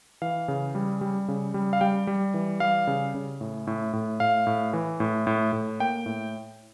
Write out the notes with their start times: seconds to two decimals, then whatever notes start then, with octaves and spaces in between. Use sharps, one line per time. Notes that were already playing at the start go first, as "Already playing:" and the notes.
0.22 E3 F5
0.48 C#3
0.75 G3
1.01 G3
1.28 C#3
1.54 G3
1.73 F5
1.81 G3 G5
2.07 G3
2.34 E3
2.60 G3 F5
2.87 C#3
3.15 C#3
3.41 A2
3.67 A2
3.93 A2
4.20 A2 F5
4.47 A2
4.73 E3
5.00 A2
5.27 A2
5.53 A2
5.80 A#3 G5
6.06 A2